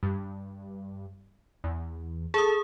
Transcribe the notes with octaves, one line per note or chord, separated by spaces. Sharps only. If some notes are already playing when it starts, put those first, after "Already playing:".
G2
E2
G#4 A4 A5 D#6